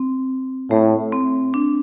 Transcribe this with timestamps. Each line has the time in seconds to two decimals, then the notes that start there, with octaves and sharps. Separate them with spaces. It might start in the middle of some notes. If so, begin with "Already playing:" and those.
Already playing: C4
0.71 A2 A3
1.13 C4
1.54 D4